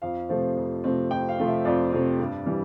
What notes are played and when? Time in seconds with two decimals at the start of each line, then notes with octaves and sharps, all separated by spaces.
0.02 F2 F5
0.29 C3 F3 A3 C4
0.57 F2
0.84 C3 F3 A3 C4
1.11 F2 G5
1.29 F5
1.39 C3 F3 A3 C4
1.47 E5
1.65 F2 D5
1.93 C3 F3 A3 C4
2.20 G2
2.46 E3 G3